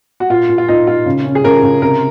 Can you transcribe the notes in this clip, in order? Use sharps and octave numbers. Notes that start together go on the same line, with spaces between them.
F#4
A#2 F4
A#2
F4
A#2 D#4
A#2 F4
C#3
C#4
G#4
C#3 A#4
C#3
C3 A#4